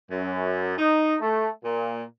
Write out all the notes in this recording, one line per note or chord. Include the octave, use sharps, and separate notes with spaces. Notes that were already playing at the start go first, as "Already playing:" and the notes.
F#2
D#4
A3
A#2